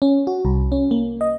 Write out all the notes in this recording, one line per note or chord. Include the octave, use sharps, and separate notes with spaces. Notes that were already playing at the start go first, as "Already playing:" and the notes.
C#4
F#4
C2
C#4
A#3
D#5